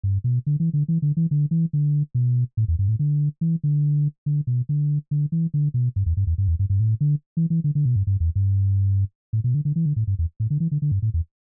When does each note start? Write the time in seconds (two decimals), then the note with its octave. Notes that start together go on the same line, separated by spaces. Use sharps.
0.03 G2
0.24 B2
0.47 D3
0.60 E3
0.73 D3
0.88 E3
1.02 D3
1.17 E3
1.31 D3
1.51 E3
1.73 D3
2.15 B2
2.57 A2
2.68 E2
2.79 G2
2.88 A2
2.99 D3
3.41 E3
3.64 D3
4.26 D3
4.47 B2
4.69 D3
5.11 D3
5.32 E3
5.54 D3
5.74 B2
5.96 G2
6.06 E2
6.17 G2
6.27 E2
6.38 G2
6.48 E2
6.59 G2
6.70 G2
6.80 A2
7.01 D3
7.37 E3
7.50 E3
7.64 D3
7.75 D3
7.85 B2
7.96 G2
8.07 G2
8.20 E2
8.35 G2
9.33 A2
9.44 B2
9.54 D3
9.65 D3
9.76 E3
9.86 D3
9.96 A2
10.07 G2
10.19 E2
10.40 A2
10.50 D3
10.60 E3
10.71 D3
10.82 D3
10.92 G2
11.02 A2
11.14 E2